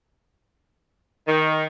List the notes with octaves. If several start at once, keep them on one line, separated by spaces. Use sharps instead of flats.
D#3